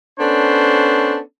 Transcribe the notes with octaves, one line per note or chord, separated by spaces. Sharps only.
B3 C#4 D4 A4 C5